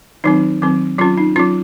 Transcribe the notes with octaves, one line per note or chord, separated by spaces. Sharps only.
D#3 F#3 C4 D#4
D#3 F#3 C4
F#3 C#4 F4
D#4
F#3 C#4 F4